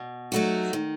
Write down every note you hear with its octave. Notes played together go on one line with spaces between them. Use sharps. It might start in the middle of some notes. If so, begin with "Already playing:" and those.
Already playing: B2
F#3 A3 D#4 F#4
D#3